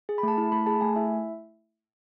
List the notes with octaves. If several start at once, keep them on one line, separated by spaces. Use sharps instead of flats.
G#4
B5
A3 A5
E4
A3 B5
G#4 A5
A3 G#5
E4 E5